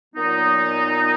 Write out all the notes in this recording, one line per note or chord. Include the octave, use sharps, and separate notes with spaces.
A#2 F#3 B3 D#4